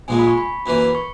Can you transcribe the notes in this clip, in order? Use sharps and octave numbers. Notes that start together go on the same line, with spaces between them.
A#1 A#2 G#3 G#5
B5
C#6
B5
F#2 E3 A#3 B5
C#6